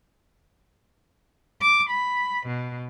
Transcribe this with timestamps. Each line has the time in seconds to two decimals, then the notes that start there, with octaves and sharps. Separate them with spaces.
1.61 D6
1.90 B5
2.46 B2